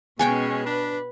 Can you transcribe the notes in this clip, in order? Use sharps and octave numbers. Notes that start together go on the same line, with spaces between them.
B2 G#3 B3 C#4 C#5 G5 G#5
D4 B4